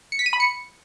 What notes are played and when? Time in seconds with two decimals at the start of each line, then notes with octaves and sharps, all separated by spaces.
0.12 C#7
0.19 B6
0.26 D#7
0.33 B5
0.40 C#7